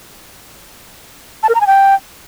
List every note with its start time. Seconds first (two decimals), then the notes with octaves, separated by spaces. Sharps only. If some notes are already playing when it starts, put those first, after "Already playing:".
1.43 A5
1.49 A#4
1.55 A#5
1.61 G#5
1.67 G5